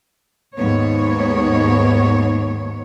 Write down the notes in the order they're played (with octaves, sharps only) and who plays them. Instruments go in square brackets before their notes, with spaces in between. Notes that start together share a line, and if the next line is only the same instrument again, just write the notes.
[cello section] D#2 G#2 B3 C#5